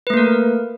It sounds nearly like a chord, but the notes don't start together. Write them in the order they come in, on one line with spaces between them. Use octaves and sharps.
B4 A3 A#3 A#4